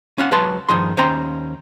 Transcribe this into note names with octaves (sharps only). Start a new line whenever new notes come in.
C#4 F5 F#5
C#2 F#3 B4 C#5 A5 C6
G2 D#3 F3 G#4 C6
D#2 C#4 C5 G5 A#5 C6